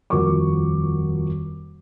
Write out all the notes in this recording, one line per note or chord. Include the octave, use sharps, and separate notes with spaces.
D#1 F2 F#4 A#4 C#6 D6